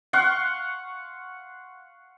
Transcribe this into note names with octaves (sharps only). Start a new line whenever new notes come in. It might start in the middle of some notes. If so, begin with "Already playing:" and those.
F5 F#5 C6 C#6